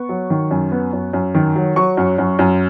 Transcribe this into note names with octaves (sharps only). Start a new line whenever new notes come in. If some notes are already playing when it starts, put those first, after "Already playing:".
Already playing: B3 C#6
F#3
D#3
F#2
B3
F#2
F#2
D#3
F#3
F#3 C#6
F#2
F#2
F#2